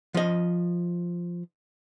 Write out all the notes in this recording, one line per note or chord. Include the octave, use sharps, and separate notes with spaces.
F3 D#5